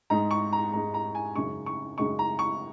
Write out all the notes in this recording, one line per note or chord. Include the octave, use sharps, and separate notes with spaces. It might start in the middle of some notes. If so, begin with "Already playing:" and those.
G#2 G#3 D#4 A#5
C#6
A#5
G#2 G#3 D#4 A#5
A#5
G#5
F#2 C#3 G#3 D#4 C#6
C#6
F#2 C#3 G#3 D#4 C#6
A#5
C#6